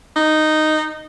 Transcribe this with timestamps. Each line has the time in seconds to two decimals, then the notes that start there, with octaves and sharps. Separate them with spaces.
0.16 D#4